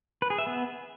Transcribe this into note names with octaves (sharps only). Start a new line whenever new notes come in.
B4
G#4
E5
B3